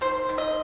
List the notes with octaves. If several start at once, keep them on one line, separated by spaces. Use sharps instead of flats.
D#3 C5
D#3
D#5